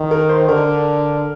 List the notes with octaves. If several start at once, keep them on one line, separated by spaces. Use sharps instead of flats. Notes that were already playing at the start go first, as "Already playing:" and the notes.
Already playing: D#3
A#4
C5
D3 A#4